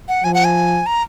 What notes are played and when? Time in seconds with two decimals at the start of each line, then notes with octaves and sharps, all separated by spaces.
0.08 F#5
0.24 F3 G#5
0.34 F#5
0.44 G#5
0.86 A#5